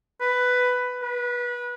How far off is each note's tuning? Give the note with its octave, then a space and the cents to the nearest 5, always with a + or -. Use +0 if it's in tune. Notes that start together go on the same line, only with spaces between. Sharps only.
B4 +10
B4 -25